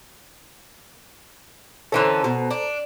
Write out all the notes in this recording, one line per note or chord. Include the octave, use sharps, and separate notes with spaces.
D3 E3 C#4 A4 C5 A#5
B2
D4